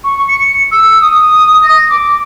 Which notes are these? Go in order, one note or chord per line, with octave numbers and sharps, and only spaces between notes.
C#6
C#7
E6
D#6
A#6
D6